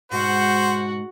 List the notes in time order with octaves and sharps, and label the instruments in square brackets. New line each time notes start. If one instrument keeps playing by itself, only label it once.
[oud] G#2 B2 G#3 [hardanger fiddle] F#4 F#5 [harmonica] C5